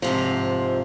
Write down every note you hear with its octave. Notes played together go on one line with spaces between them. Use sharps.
G#2 C3 F3